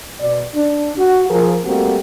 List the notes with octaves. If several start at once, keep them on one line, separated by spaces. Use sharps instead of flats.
B2 D5
D4
F#4
F3 G#4 A#4
G3 A3 A#3 C4 F#4 G4